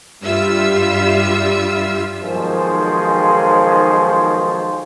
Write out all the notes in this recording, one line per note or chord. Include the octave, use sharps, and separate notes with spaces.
G2 G3 F4 E5 E6
B1 D#3 F3 G#3 G#4 C5